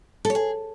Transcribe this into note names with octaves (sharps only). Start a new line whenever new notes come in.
A4
C#5
G#4